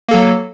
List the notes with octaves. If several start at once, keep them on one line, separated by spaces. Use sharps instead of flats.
F#3 A#3 A4